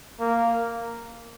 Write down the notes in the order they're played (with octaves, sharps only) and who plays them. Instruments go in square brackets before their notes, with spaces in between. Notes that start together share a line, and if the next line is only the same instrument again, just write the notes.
[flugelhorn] A#3